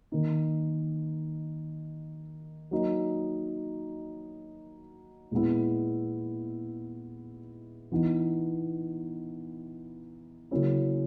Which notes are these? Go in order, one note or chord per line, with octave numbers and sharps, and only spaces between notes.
D#3 A#3 D#4
F#3 A#3 D#4
A#2 G#3 B3 E4
E3 B3 D#4
C#3 F#3 A#3 C#4 E4